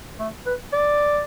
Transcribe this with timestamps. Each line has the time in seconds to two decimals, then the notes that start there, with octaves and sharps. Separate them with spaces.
0.20 A3
0.46 B4
0.73 D5